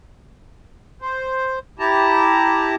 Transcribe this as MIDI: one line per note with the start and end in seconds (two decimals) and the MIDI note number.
1.02 1.59 72
1.79 2.76 64
1.79 2.76 67
1.79 2.76 81
1.79 2.76 82